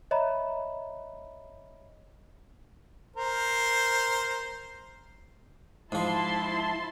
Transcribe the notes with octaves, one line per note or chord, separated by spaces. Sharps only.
C#5 D#5 E5 A#5 B5
A#4 C5
G#2 F3 E4 A5 C6